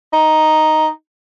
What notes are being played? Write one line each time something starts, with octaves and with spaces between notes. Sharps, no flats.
D#4